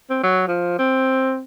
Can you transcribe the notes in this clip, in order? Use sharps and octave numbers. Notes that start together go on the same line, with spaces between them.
C4
F#3
F3
C4